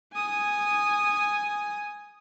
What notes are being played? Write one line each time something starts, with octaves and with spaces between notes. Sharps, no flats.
G#5 D#6